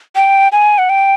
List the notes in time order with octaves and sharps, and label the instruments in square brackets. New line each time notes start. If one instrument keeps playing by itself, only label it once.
[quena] G5
G#5
F#5
G5